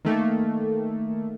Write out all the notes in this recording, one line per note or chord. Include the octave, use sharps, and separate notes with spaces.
D#3 A3 A#3